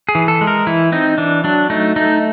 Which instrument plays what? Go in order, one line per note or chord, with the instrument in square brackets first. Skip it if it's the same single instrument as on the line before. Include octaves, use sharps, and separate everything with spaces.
[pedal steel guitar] G#4
E3
A4
G#3
A#4
E3 E4
C4 D#4
E3 D4
F#3 D4
A3 D#4
A3 D#4